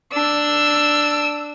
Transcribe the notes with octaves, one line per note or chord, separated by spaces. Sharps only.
D4 E6